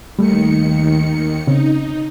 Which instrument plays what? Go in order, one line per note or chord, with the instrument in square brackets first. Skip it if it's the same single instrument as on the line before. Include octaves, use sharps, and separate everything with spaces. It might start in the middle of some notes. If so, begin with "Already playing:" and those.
[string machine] D#2 D#3 C#7 [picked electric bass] G3 A3
[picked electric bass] C#3 C4 C#4 [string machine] D#4